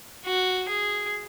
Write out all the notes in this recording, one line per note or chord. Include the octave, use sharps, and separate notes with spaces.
F#4
G#4